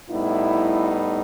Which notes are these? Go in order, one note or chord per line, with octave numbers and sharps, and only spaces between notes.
A2 G3 B3 D#4 E4